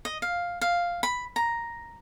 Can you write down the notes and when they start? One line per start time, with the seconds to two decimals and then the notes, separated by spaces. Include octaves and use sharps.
0.05 D#5
0.22 F5
0.61 F5
1.03 B5
1.36 A#5